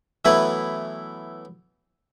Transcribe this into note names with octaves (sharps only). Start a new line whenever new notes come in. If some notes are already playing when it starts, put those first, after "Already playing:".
E3 F#3 A3 B3 E4 B4